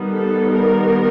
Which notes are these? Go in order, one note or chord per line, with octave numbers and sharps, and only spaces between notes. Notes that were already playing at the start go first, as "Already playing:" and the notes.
Already playing: D#3 G3 B3
A4
A#4